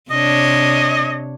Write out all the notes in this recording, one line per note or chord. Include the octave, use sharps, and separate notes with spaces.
C3 D4 C#5 D#5